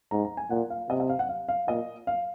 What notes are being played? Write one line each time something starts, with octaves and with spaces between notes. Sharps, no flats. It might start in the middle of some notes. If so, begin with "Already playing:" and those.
G#2 A#5
A#5
G#5
A#2 F#5
F5
C3 D#5
D#5
F5
F#5
F5
F5
A#2 D#5
F5